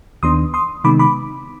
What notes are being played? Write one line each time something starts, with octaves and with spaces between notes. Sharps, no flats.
D#2 D#3 B3 D4 C6 D#6
C6 D#6
C3 D#3 G#3 B3 D#4 B5 D6
B5 D6